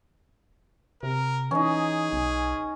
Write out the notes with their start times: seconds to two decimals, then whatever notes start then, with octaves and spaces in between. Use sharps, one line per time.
1.03 C3 A#4
1.51 E3 C#4 D#4 G#4
2.12 B1